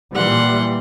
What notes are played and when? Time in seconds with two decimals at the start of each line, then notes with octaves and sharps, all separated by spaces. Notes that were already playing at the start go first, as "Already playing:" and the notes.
0.15 A#2 E3 G3 F#5 C6